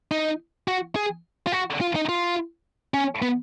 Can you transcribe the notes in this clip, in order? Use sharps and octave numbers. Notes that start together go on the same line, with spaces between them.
D#4
F#4
G#4
F4
F#4
F4
D#4
F4
C#4
B3